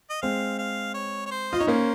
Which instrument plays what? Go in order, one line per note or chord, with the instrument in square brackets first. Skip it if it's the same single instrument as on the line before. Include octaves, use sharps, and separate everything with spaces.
[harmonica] D#5
[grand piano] G#3 C4 [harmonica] F5
[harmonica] F5
C#5
C#5
C5
[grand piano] F4 [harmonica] D#5
[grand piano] D#4 [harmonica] C#5
[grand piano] A#3 C#4 [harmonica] C5